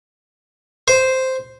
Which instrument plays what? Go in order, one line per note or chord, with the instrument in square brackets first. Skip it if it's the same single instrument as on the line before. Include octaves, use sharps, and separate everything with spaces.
[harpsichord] C5